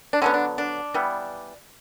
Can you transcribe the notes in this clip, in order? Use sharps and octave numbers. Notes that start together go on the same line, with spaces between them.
D4
D3 F#3 B3 C#4
D4
D4
E3 G3 B3